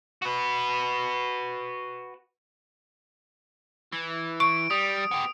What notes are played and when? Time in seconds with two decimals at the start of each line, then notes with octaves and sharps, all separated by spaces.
0.22 F#4 B4
3.92 E3
4.40 C#6 D7
4.71 G3 D#6
5.11 B3 G4